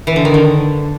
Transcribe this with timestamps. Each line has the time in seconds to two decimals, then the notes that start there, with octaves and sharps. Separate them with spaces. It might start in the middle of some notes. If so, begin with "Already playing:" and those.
0.07 E3
0.16 D3
0.25 D#3
0.34 D3